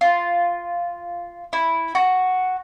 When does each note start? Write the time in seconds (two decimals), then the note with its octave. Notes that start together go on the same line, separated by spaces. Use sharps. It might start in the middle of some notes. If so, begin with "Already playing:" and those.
0.01 F4
1.53 E4
1.95 F#4